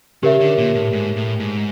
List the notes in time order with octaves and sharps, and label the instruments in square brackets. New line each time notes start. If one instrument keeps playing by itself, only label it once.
[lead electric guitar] C#3 [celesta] G4 A#4 C#5 E5
[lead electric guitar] D3
A#2
A2
G#2
A2
G#2